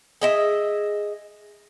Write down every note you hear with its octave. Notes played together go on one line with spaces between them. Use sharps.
G#4 D#5 E5